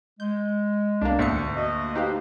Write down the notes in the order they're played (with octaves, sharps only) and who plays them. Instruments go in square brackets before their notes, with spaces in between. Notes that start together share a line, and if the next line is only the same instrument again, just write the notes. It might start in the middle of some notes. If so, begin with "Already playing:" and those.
[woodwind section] G#3 [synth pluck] G6
[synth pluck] C2 A#3 [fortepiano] D4
[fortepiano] D2 [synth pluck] G#2 E5 C#7
[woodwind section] A#3 F#4 D#5
[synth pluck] D#4 G4 F5 [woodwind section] B4 C5